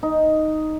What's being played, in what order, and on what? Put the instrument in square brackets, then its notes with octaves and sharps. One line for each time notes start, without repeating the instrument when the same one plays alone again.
[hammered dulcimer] D#4